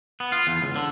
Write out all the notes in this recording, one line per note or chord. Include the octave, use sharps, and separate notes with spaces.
B3
F4
E2
C#2
D3